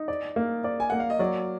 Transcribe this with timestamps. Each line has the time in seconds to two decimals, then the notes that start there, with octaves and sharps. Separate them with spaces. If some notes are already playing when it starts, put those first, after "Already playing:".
Already playing: D#4
0.08 D5
0.36 A#3
0.64 D5
0.80 G#5
0.90 A#3 F#5
1.00 F5
1.10 D#5
1.19 F#3 D5